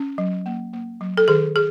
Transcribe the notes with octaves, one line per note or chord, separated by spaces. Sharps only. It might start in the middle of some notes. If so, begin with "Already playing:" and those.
Already playing: C#4
F#3
A#3
A#3
F#3
A4
D#3 G#4
G#4